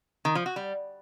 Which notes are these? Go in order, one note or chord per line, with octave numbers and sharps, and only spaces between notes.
D#3
F3
F#4
G3